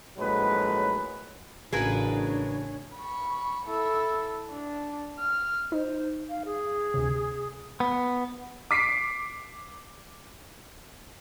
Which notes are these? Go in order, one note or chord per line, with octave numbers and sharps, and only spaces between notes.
A#1 A2 F#3 G#3 B4
A1 C#3 D4 F#4 G#4 A#4 B4 C#5
B5 C#6
E4 A4
D4
F6
D#4 C5
F5
G#4
D2 C3
B3
D6 B6 C7 D7